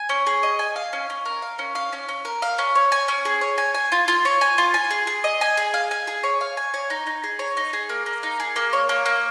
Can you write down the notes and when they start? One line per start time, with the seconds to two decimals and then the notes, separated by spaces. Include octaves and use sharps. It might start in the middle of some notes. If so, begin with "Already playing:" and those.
Already playing: G#5
0.09 C#4
0.27 G#4
0.43 D#5
0.59 G#5
0.76 F5
0.93 C#4
1.10 C#4
1.25 A#4
1.42 F5
1.59 C#4
1.75 F5
1.93 C#4
2.09 C#4
2.25 A#4
2.42 F5
2.58 C#4
2.75 C#5
2.92 G#5
3.08 C#4
3.25 G#4
3.41 C#5
3.58 G#5
3.74 G#5
3.92 F4
4.08 F4
4.25 C#5
4.41 G#5
4.58 F4
4.74 G#5
4.91 G#4
5.07 G#4
5.24 D#5
5.41 G#5
5.57 G#4
5.74 F5
5.91 G#5
6.07 G#4
6.23 C#5
6.41 F5
6.57 G#5
6.74 C#5
6.90 D#4
7.07 D#4
7.24 G#4
7.39 C#5
7.57 D#4
7.73 G#4
7.89 A#3
8.06 A#3
8.23 D#4
8.40 G#4
8.56 A#3
8.73 C#5
8.89 A#3
9.06 A#3